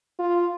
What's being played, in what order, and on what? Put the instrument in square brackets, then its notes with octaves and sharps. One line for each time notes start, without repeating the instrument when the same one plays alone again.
[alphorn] F4